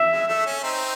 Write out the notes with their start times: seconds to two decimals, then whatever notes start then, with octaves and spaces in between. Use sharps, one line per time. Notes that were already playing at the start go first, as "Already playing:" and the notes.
Already playing: E5
0.10 G#3
0.28 A3
0.46 C#4
0.63 C4 D#4